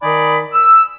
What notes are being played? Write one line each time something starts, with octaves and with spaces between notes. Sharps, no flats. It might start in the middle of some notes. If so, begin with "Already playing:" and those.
D#3 D#4 D5 G#5 B5
E6